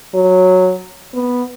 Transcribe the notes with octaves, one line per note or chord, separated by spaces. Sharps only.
F#3
B3